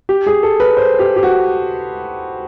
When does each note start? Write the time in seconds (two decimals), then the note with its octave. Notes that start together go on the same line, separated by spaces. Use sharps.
0.09 G4
0.27 G#4
0.43 A4
0.60 B4
0.77 C5
0.99 G4
1.16 G4
1.23 F#4